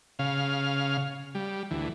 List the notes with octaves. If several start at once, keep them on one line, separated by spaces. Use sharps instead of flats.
C#3 F5
G3
D2 E3